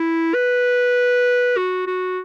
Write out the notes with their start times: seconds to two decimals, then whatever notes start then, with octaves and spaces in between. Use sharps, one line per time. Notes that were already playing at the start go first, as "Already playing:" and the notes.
Already playing: E4
0.34 B4
1.57 F#4
1.87 F#4